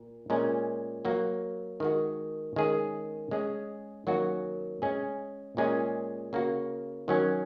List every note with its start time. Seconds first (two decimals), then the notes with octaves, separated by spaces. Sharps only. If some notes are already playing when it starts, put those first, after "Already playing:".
Already playing: A#2
0.30 A#2 G#3 C#4
1.05 F#3 A#3 F#4
1.80 D#3 G#3 F#4
2.56 D#3 G#3 C#4 G#4
3.31 G#3 C#4 G#4
4.07 D#3 F#3 A#3 C#4 F#4
4.82 G#3 C#4 G#4
5.57 A#2 G#3 C#4 G#4
6.33 C#3 A#3 F#4
7.08 D#3 F#3 C#4